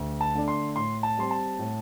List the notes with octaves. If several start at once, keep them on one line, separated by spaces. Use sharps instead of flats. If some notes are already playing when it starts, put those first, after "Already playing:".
Already playing: D2
A5
D3 A3 D4
C6
A2 C6
A5
G3 C4 C6
A5
A2